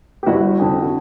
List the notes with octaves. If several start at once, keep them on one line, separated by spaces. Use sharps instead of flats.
G4
G1 E4 F#4
F2 D3
F#4